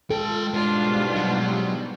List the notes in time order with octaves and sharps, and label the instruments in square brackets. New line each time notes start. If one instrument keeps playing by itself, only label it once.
[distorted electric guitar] G#3 G5 [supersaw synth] F4 [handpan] A4
[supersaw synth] G#2 B2 G3 [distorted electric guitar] G#3 [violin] D4 F4
[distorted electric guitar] F#3